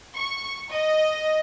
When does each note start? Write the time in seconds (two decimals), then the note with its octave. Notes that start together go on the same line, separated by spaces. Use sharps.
0.14 C#6
0.70 D#5